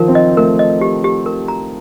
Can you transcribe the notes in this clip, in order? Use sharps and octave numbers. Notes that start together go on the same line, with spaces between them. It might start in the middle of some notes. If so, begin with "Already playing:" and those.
Already playing: D#3 F3 A#4
C4
D#5
A3 A#4
D#5
G4
G4
A#4
A#5